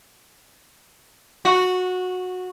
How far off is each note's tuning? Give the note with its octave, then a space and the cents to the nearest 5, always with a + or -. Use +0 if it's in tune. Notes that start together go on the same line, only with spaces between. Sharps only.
F#4 -15